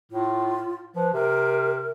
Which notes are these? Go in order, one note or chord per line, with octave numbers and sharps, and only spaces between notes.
A2 F4
F3 B4
C3 A#4